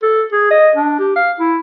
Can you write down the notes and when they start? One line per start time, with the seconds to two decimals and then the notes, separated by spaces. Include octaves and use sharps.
0.02 A4
0.32 G#4
0.51 D#5
0.75 D4
0.99 G4
1.16 F5
1.40 E4